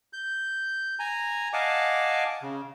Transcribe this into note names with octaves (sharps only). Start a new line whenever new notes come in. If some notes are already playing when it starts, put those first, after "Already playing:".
G6
G#5 A#5
D#5 F5 F#5 G#5 A5 D6
C#3